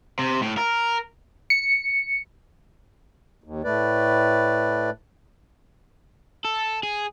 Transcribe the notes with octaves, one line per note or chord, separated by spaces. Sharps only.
C3
A2
A#4
C#7
D#2
A2 A3 B4 D5
A4
G#4